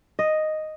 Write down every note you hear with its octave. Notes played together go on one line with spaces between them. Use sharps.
D#5